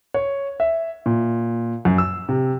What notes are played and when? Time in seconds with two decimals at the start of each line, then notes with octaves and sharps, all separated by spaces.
0.14 C#5
0.60 E5
1.06 A#2
1.85 F#2
1.98 E6
2.29 C3